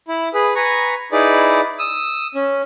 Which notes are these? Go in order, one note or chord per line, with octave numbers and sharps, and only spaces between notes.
E4
G#4 B4
B4 G#5 A#5 C#6
D#4 E4 G#4 B4 D5
D#6 E6
C#4